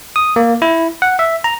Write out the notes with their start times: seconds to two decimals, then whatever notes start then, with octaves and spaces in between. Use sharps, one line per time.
0.16 D#6
0.36 A#3
0.62 E4
1.02 F#5
1.19 E5
1.44 A#5